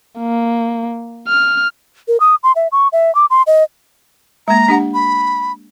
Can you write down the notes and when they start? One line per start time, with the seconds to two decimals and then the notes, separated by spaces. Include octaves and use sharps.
0.19 A#3
1.28 F6
2.08 A#4
2.20 D#6
2.43 C6
2.56 E5
2.72 C#6
2.93 E5
3.15 D6
3.30 C6
3.47 D#5
4.48 G#3 A#3 A#5
4.68 D4 G4 F#5
4.94 B5